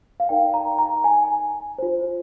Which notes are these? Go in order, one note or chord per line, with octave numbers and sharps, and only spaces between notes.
F5
D#4 A#4 D5 G5
A#5
A#5
G#5
F4 C5